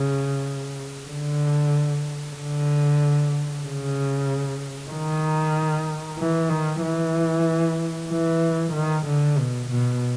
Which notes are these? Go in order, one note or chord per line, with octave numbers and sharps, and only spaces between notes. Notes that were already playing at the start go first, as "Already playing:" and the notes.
Already playing: C#3
D3
D3
C#3
D#3
E3
D#3
E3
E3
D#3
D3
B2
B2